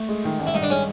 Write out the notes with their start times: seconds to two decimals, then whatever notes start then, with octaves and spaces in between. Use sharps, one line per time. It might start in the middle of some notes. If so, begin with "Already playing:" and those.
Already playing: A3
0.09 G#3
0.25 D#3
0.39 A1
0.47 E4
0.55 G2 D#4
0.63 D4
0.70 G#3 C#4